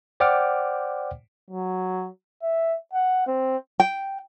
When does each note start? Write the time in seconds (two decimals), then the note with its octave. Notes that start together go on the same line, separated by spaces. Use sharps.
0.20 C5 D5 F#5 G5 D6 F6
1.51 F#3
2.42 E5
2.93 F#5
3.27 C4
3.80 G5